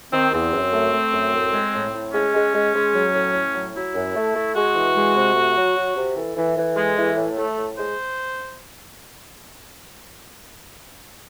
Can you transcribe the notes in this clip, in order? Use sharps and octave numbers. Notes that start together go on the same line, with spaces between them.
D#3 C4
E2 C4
F#2
A3
A3
F#2
A2
G#3
A2
A2
G#3 C#4
G#3
G#3
G#3
F#3
A2
A2
F#3
F#3 E4
F#2
A3
A3
G#3 F#4
E3
G#3
C3
A3
F#3
F#3
C3
E3 A4
E3
E3
G#3
E3
A2
A3
A2
G#3 C5